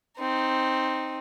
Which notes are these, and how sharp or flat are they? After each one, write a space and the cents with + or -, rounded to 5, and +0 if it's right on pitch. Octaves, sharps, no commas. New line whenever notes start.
C4 +0 D#4 +0